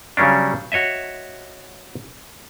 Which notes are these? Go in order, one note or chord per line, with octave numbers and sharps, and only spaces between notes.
C#3 F#3 G3 C#4 D4
F#4 C#5 D#5 E5